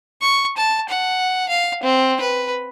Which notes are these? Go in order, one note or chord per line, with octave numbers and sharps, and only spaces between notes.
C#6
A5
F#5
F5
C4
B4